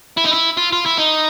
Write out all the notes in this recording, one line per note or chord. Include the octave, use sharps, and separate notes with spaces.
E4
D#4
E4
F4
F4
E4
D#4